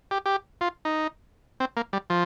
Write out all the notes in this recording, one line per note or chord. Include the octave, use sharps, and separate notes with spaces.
G4
G4
F4
D#4
C4
A#3
G3
F3